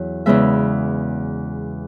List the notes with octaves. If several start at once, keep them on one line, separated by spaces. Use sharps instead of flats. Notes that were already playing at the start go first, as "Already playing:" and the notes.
Already playing: E2 F#3 C#5
E2 C#3 G#3 B3 E5